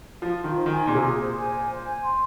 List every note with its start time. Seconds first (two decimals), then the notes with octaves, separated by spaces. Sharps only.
0.22 F3 F4
0.39 F4
0.44 D#3
0.55 C5
0.66 D#3 G#5
0.87 A#2 G#4
0.95 C3
1.03 A#2 G#4
1.20 C5
1.37 G#5
1.53 C5
1.69 C5
1.85 G#5
2.03 C6